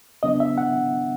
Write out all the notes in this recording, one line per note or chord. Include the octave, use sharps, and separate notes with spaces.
C#3 F#3 B3 D4 D#5
E5
F#5